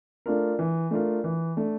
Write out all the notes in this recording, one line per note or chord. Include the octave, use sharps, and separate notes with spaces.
A3 D4 F4 A#4
E3
A3 D4 F4 A#4
E3
A3 D4